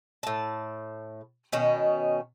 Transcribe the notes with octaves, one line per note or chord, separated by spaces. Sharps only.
A2 A5
B2 D#3 C#4